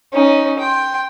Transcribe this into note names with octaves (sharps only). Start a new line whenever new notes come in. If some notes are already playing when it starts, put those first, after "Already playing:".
C#4 D#4
G5 C6